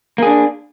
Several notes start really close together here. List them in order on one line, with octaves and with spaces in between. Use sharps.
A#3 G#4 D4